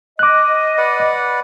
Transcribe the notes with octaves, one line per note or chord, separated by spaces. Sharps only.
D#5 D6 F#6
B4 D5 F#5